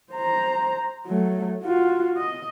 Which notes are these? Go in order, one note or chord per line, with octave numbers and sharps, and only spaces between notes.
C5 A#5
F#3 A3
F4 F#4
D#5